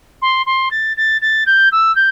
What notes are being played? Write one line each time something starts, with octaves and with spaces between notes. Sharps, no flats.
C6
C6
A6
A6
A6
G6
E6
G6